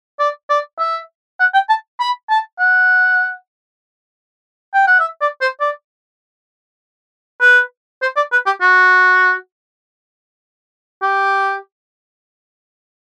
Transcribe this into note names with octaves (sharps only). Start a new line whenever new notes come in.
D5
D5
E5
F#5
G5
A5
B5
A5
F#5
G5
F#5
E5
D5
C5
D5
B4
C5
D5
B4
G4
F#4
G4